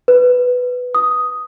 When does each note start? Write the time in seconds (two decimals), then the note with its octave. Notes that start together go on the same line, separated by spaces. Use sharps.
0.08 B4
0.95 D#6